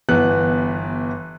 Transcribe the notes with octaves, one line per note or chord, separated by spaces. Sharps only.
G1 E3 B3 F#6